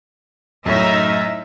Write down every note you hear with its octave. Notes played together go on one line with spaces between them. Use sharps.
F#2 A2 D#4 C#5 E5